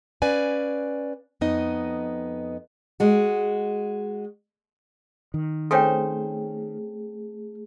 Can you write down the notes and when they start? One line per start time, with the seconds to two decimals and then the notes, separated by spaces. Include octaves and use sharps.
0.22 C#4 B4 D5 F5 G#5
1.41 F2 B3 D#4 D#5
3.00 G#3 F#4
5.34 D#3
5.71 A3 C4 C#4 G#4 A4 C5 C#5 G5